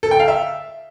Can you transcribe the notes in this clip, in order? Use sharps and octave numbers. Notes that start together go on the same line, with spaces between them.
A4
G5
F5
E5